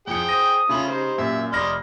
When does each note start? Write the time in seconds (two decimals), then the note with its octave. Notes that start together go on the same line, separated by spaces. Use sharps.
0.07 F2 F3 G#4 G5 C#7
0.28 C5 D#6 A#6
0.69 C#3 A3 C#4 F4 B5 F#7
0.88 D#4 G4 C5
1.18 F#2 A#2 E5
1.53 F1 D5 D#5 B5 C6 F6 A#6